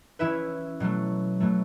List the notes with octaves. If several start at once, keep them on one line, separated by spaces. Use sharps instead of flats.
E3 C#4 E4 B4 E5
B2 F#3 A3
B2 F#3 A3